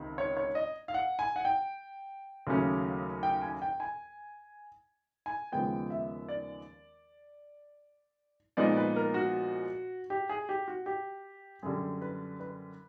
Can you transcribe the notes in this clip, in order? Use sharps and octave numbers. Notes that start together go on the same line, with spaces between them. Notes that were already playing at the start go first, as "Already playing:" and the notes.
Already playing: C#2 C3 D#3
C#5
C#5
D#5
F5
F#5
G#5
F#5
G5
D#2 C#3 F#3 A3 C#4
G5
G#5
G5
G#5
G#5
D#2 C#3 F3 G#3 B3 G5
E5
D5
A#2 F3 G#3 B3 D#4 D5
B4
A#4
F#4
G4
G#4
G4
F#4
G4
F#2 D3 G3 G#4
B4
B4